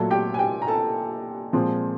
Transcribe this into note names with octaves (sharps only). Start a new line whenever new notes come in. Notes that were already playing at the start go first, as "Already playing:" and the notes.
Already playing: A#2 F#3 A3 A4 A5
G4 G5
G#5
G4 G5
A#5
A4 A5
A#2 F3 G#3 C4